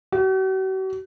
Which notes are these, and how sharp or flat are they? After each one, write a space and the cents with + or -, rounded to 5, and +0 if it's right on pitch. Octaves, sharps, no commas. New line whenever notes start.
F#4 +45